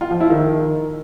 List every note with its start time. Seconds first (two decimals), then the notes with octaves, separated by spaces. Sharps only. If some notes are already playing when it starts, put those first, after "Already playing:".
0.01 F4
0.11 F3
0.20 E4
0.30 D#3